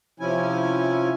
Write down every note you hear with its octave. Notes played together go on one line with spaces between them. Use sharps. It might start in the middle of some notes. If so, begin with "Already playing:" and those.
C3 F3 C#4 E4 G#5